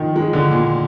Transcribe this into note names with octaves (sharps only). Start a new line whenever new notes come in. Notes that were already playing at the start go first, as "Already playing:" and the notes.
Already playing: D#3 F3
G#3
D3
A#2